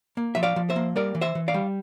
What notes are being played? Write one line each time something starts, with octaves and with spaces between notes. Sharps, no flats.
A#3
F3 E5
D5 F5
F3
C5 E5
A#3
G3 A#4 D5
E3
C5 E5
E3
D5 F5
G3